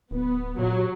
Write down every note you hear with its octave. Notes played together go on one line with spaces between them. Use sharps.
D1 B3
A#2 F#3